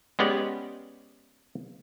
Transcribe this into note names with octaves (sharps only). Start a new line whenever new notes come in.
G#3 B3 C#4 G4 D5